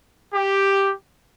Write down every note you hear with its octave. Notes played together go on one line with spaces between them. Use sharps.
G4